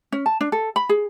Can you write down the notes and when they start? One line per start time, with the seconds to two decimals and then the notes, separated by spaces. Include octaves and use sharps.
0.12 C#4
0.26 A5
0.41 D4
0.52 A4
0.76 B5
0.89 G#4